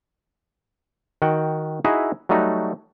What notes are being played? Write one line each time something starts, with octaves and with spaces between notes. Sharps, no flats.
D#3 F#4 F#5 G5
D#4 E4 F#4 G#4 D#5 E5
F#3 G3 A3 D#4 F#4